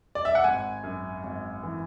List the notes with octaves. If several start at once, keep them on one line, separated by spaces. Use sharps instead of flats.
D5
E5
F#5
G#1 G#5
F#2
G#1
E3